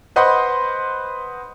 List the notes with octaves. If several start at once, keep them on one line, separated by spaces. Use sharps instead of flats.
B4 C5 D#5 F#5 B5 C6